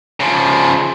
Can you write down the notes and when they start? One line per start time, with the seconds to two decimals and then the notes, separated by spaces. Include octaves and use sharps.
0.20 C#3 F3